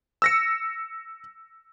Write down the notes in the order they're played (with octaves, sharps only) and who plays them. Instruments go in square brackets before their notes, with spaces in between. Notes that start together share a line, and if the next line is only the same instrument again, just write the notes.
[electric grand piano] E6 A#6 C#7